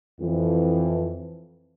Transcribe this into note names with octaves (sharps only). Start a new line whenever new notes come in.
F2 E3